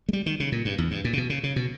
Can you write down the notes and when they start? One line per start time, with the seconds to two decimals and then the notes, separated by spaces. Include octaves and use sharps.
0.09 G#3
0.13 G3
0.26 D#3
0.40 C#3
0.52 A#2
0.65 G2
0.78 E2
0.91 G2
1.04 A#2
1.13 C#3
1.18 B2
1.30 C#3
1.43 C#3
1.56 B2